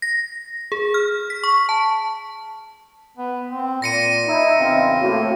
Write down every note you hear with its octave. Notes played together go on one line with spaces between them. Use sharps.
A#6
G#4
F6
B6
C#6
A5
B3
C4
A#2 A#6 C#7 D#7
D#4 E4 E5
E2 C#3 C4 F4
A2 A#3 F#4